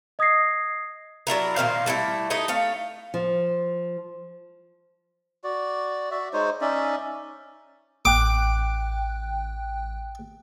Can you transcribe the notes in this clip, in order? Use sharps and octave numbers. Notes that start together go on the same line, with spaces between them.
D#5 D#6 G#6 A#6 C7
F#3 D4 E4 A#4
A#2 D#3 C5 F5
G3 A3 A#3 E4
A3 D#4 E4 D#5
A3 C#5 F5
F3
F#4 D5
F#4 D5 E5
G#3 D#4 C5 C#5
C#4 D#4 D5 E5
A1 G5 D6 F#6